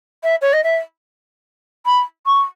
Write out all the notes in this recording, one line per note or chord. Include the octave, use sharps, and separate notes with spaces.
E5
C#5
D#5
E5
B5
C#6